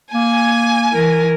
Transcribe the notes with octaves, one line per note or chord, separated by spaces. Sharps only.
A#3 G#5
E3 A#4